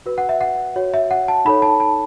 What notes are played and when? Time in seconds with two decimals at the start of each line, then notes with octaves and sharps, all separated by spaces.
0.06 F#4 B4
0.18 F#5
0.29 E5
0.41 F#5
0.76 F#4 C#5
0.94 E5
1.11 F#5
1.28 A5
1.45 D#4 A4 C#5 B5
1.62 A5
1.80 A5